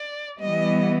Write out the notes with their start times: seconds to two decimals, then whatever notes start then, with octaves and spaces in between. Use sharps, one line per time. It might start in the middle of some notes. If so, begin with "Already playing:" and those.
Already playing: D5
0.39 E3 G3 B3 D#5